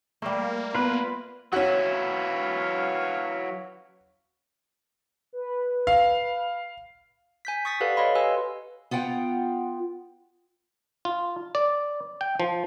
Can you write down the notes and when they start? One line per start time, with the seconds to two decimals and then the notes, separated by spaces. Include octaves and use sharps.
0.22 G3 A3 A#3
0.75 B3 F4 B4
1.53 F#3 C#4 E4 F#4 B4 C#5 F5
5.33 B4
5.87 F5
7.45 G#5 G6 B6
7.65 C#6 D#6 A6 B6
7.80 G4 A4 B4 D5 F5 F#5
7.97 C#5 D#5 F5 B5 C6
8.15 G4 B4 G#5 C6 E6
8.91 B3 F4 F#5 G5
11.05 F4
11.55 D5
12.21 G5
12.40 F3